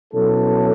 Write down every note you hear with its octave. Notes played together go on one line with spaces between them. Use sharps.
B2 F#3 C#4 E4 A4